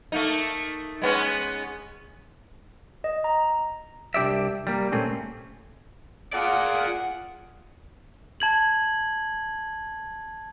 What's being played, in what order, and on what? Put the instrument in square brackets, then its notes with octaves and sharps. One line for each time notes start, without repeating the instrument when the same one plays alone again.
[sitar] A3 A#3 D#4
G#3 B3 C#4
[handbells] D#5
A#5
[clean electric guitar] C2 D4 G4 D5 E5
G3 A#3
A#2 A3 C4 C#4
[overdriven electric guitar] F4 D5 [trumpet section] G#4 F#5
[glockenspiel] A5 G#6 F#7